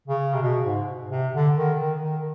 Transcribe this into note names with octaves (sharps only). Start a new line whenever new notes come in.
C#3
C3
B2
G#2
C3
D3
D#3
D#3
D#3